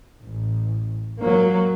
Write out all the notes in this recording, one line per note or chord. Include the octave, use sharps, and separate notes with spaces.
A1
F#3 A#3